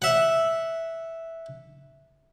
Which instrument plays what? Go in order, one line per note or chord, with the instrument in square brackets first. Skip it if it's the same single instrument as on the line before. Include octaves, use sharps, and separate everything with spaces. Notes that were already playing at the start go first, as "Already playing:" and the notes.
[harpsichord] E5 F#5